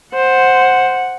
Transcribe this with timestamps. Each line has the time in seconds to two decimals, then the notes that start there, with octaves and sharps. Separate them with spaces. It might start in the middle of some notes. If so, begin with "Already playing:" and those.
0.15 C5 F#5